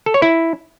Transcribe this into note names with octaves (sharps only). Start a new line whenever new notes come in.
A4
C#5
E4